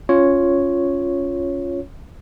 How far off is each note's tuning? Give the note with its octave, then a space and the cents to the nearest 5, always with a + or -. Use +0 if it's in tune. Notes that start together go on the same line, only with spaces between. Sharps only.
C#4 +0 F4 +0 C#5 +0